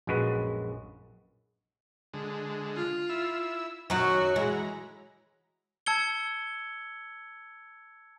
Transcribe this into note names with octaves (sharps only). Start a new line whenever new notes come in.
A#1 F#2 G#3 F#4 B4
D3 G#3
F4
E4 E6
F#2 D#3 F#3 F#4
E3 G#3 A#5
A5 E6 G#6 C#7 G7